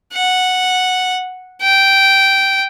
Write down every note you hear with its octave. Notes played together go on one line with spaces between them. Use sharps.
F#5
G5